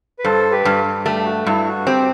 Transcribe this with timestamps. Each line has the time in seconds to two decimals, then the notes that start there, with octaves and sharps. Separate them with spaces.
0.19 B4
0.24 G2 A4 C5
0.51 G4 B4
0.65 G2
1.05 A3 G4
1.25 F#4
1.46 G2 E4
1.67 F#4
1.86 C4 G4